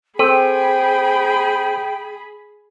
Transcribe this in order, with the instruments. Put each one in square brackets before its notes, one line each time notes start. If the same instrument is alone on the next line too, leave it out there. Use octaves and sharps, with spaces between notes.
[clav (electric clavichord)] C4 [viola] G#4 B5 [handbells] A4 [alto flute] G5